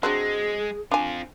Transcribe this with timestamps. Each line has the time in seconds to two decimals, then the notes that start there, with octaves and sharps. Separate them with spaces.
0.03 F#3 G#3 C4 D4 G#4
0.91 C4 D4 F4 G#5